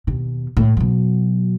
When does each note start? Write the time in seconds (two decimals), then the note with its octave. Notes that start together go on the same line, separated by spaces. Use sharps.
0.07 D#2 B2
0.57 A2
0.77 B2 F#3